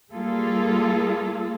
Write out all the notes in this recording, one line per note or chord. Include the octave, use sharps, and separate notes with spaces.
G3 A#3 F4 G#4 A4